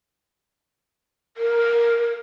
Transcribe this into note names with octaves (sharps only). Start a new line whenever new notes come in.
A#4